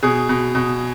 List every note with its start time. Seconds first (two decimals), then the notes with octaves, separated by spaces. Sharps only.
0.03 B2 G#4
0.29 B2
0.55 B2